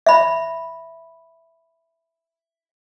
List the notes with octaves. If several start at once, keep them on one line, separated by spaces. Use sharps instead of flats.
E5 B5